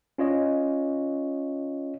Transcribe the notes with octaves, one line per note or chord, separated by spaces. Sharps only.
C#4 F4 C#5 D#5